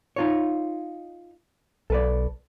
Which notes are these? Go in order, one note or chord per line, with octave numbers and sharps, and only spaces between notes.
D#4 F4 C#5
B1 A4 B4 D5